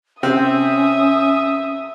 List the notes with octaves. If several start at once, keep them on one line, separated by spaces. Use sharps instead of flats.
C3 C4 C#4 E5 D#6